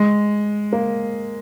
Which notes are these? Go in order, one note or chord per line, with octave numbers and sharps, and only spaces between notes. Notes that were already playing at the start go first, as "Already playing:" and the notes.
Already playing: G#3
A#3